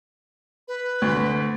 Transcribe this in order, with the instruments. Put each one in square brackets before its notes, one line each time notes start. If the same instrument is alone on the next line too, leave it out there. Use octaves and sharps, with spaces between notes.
[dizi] B4
[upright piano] D2